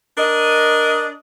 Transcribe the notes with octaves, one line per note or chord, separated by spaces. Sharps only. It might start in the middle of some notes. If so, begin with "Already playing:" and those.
D4 A#4 D#5